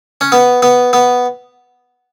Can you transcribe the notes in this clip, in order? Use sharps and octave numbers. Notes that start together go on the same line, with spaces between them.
C#4
B3
B3
B3